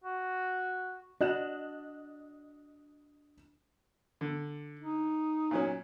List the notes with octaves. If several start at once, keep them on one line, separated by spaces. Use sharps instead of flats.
F#4
D4 F#4 D#5 F#6 E7
D3
D#4
A#2 F#3 C#4